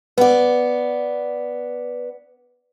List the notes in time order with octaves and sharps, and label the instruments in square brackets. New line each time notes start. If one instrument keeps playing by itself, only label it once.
[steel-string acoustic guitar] B3 D5 [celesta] B4 F#5